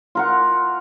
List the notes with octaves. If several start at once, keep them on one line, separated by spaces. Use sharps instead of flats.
F4 A#4 F#5